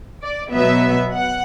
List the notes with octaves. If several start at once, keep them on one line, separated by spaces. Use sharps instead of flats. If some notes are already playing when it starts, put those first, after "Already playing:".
D5
B2 F#3 B3 E5
F#5